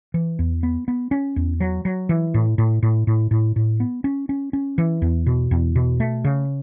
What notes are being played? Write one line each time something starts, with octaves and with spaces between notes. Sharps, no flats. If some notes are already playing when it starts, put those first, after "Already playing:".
E3
E2
B3
B3
C#4
E2
F#3
F#3
E3
A2
A2
A2
A2
A2
A2
B3
C#4
C#4
C#4
E3
E2
B2
E2
B2
A3
C#3